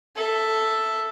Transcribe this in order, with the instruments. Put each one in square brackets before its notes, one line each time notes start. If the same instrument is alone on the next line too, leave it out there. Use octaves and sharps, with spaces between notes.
[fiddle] A4 E5